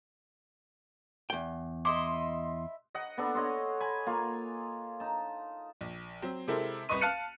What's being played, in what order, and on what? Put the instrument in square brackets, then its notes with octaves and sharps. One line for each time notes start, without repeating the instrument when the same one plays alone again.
[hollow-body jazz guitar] E2 G5
[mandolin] E4 D#5 E5 [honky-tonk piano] C6 [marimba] D6
[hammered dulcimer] D#5 F#5
B3 D4 A4
C#5 D#5 F#5 C6
G#5 B5
A#3 F4
D#4 A5
[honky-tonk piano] A#1
F#3 C4
C3 G#3 C4 E4 A4 A#4
C2 B4 D#5 C#6 D#7
F5 A5 F6 F#6 C#7 D#7